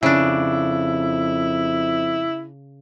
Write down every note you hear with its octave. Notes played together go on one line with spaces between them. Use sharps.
F2 C#3 D4 E4